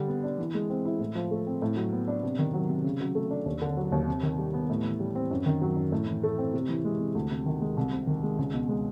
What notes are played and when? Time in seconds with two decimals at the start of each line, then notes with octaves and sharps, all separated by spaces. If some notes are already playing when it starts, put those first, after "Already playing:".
Already playing: D3 G3
0.08 B3
0.24 D4
0.38 E3
0.55 G#3
0.70 C4
0.85 E4
1.00 A2
1.15 F3
1.31 A3
1.47 C4
1.62 A2
1.77 F#3
1.93 B3
2.08 D4
2.23 C3
2.39 D#3
2.54 F#3
2.69 C3
2.84 C#3
3.01 F#3
3.15 A3
3.31 D4
3.46 D#2
3.62 D3
3.77 F#3
3.92 D#2
4.08 C3
4.23 D#3
4.38 G3
4.54 B3
4.70 A2
4.85 E3
5.00 G3
5.15 C4
5.31 F#2
5.46 D#3
5.62 F#3
5.77 F#2
5.92 A2
6.08 E3
6.23 A3
6.38 C4
6.54 C3
6.69 E3
6.85 G#3
6.99 C3
7.15 D2
7.31 C3
7.46 D#3
7.61 G#3
7.77 C2
7.93 C3
8.07 D#3
8.23 G#3
8.38 C#2
8.54 B2
8.69 G#3